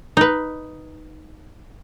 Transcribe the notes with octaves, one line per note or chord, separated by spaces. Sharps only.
D#4 B4